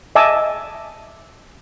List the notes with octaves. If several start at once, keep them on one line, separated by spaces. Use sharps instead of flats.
D#5 E5 G#5 A5 D6 E6